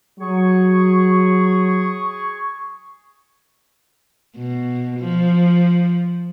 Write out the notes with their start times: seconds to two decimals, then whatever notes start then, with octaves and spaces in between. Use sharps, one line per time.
0.20 F#3 G#4 C#6
4.36 B2
5.00 F3